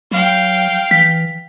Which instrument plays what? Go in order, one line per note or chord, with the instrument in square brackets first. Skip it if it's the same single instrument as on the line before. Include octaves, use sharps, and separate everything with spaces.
[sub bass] F#3 [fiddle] F5 G5
[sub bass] E3 [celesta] B6